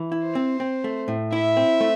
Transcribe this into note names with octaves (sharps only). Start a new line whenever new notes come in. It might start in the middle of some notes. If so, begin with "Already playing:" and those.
Already playing: E3
E4
C5
C4
C4
A3
A2
E4 E5
C4
A3